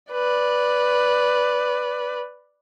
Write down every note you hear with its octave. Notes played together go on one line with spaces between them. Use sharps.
B4 D5